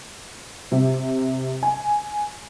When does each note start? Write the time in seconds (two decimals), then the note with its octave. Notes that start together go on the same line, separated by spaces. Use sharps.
0.72 C3
1.63 G#5